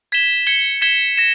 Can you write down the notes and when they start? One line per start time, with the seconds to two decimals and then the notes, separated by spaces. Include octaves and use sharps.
0.12 G#6 B6 E7 G7
0.47 G#6 C#7 G7
0.81 G#6 B6 E7 G7
1.17 A#6 E7